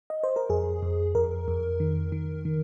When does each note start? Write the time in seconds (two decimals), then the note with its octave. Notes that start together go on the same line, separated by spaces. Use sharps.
0.10 D#5
0.23 C5
0.36 A#4
0.50 F2 G#4
0.83 F2
1.15 F2 A#4
1.48 F2
1.80 D#3
2.12 D#3
2.45 D#3